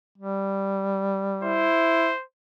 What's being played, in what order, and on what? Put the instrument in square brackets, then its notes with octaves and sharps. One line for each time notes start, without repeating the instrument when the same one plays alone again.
[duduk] G3
[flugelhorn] E4 [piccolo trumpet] C5